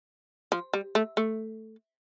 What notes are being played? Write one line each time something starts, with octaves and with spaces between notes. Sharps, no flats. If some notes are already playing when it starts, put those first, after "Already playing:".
F3
G3
A3
A3